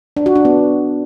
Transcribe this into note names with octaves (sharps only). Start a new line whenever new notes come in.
D4
F#4
D4
B3